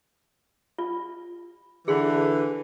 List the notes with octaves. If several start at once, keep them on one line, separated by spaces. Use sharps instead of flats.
F4
D3 E3 G#4 C6